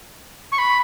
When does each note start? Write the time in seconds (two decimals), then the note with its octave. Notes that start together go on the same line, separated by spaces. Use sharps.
0.52 C#6
0.58 B5